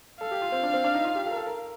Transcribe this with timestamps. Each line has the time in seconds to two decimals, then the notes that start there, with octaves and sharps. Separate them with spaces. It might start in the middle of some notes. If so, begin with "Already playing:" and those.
0.21 A4 F5
0.32 G4
0.42 F4
0.52 C4
0.63 D4
0.74 C4
0.84 D4
0.95 D#4
1.05 F4
1.16 G4
1.26 A4
1.31 A#4
1.36 A4
1.47 A#4